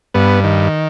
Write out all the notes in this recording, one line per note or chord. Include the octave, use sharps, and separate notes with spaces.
G2 B3
D#3